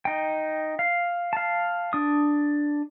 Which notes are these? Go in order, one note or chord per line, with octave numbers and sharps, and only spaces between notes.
D#4 G5
F5
F5 A5
D4 D#6